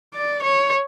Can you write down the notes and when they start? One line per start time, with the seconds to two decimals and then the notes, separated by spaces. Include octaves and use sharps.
0.14 D5
0.43 C#5